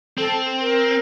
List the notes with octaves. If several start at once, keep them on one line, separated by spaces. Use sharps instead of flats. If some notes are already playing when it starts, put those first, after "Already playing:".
C4 A4
A#4